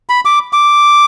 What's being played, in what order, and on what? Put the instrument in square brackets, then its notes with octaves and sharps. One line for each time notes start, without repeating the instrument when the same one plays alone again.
[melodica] B5
D6
D6